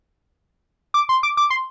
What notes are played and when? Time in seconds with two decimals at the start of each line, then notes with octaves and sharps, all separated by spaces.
0.94 D6
1.09 C6
1.23 D6
1.37 D6
1.50 C6